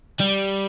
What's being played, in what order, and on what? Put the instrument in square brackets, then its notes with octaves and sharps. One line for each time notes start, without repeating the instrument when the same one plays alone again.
[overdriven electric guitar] G3